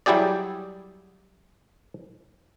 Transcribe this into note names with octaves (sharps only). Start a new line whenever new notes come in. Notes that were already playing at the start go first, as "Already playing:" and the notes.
F#3 G3 E4 G4 G#4 D5